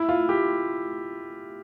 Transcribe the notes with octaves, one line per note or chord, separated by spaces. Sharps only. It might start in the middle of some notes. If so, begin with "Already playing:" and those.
Already playing: E4
F4
G4